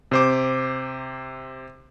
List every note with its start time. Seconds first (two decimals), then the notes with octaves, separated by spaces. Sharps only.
0.11 C3 C5 D6